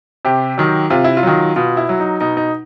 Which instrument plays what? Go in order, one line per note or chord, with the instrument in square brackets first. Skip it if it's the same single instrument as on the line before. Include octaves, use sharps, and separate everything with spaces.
[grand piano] C3 G4
D#3 F#3
C3 F4
E4
F4
D#3 F#3
B2 F4
E4
F#3
D#4
B2 D#4
D#4